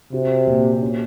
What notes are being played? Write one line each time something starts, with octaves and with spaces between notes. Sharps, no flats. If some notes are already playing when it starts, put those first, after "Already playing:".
C3 F#4
A#2
C#4